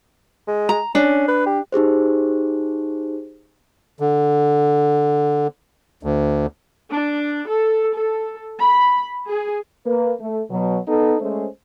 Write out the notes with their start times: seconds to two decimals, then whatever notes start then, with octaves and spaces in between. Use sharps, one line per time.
0.48 G#3
0.69 A#5
0.95 C#4 D4
1.28 B4
1.46 G4
1.72 D#4 G4 G#4 C5
4.00 D3
6.03 D2
6.91 D4
7.49 A4
7.97 A4
8.59 B5
9.28 G#4
9.86 A#3 B4
10.21 A3
10.51 B2 F#3
10.88 B3 D#4 A4
11.21 G#3 A3 C#4 C5